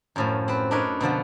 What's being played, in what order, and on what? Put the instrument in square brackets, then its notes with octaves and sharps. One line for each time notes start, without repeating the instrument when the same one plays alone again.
[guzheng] F#2 A2 F3
C4 B4
D4 D#4 A#4 B4 C#5
B2 D3 F3 B3